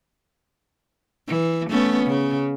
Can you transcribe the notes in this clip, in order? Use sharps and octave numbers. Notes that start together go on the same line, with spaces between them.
E3
A3 B3 C#4
C#3